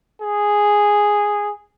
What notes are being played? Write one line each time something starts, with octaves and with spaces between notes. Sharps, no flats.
G#4